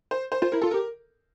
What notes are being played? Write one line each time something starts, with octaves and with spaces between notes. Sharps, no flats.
C5
C5
F4 C5
E4 A#4
F4 A4
G4 A#4